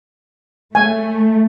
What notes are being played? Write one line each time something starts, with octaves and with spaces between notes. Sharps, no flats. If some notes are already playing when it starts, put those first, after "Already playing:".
A3 G#5